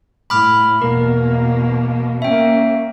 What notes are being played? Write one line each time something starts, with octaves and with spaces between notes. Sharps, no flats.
A2 B5 D6 F6
E2 B2 A#3 A#4
A#3 C#4 E5 G5